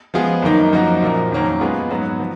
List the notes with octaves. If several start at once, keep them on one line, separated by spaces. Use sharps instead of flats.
F3 G#3 B3 F4 G#4
F#2 D#3 A#3 D#4
F#2 F3 A#3 D#4 F#4
A#2 F3 A#3
F2 D#3 F#3 A#3 C#4
G#3 B3 F4 G#4 B4
G#2 F#3 B3 F#4
F3